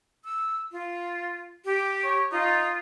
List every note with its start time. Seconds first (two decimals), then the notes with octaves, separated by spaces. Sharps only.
0.25 E6
0.72 F4
1.65 G4
2.05 C#5
2.32 D#4 F4